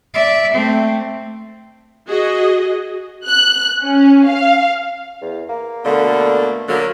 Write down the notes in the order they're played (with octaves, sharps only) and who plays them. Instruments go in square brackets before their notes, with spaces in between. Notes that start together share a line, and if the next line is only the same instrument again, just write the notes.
[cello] D5 E5
A3 C4
[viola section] F#4 G#4 D#5
[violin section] F#6
C#4
F5
[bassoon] E2
A#3
[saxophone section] B2 A3 A#3 [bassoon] D3
[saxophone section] D3 F#3 A#3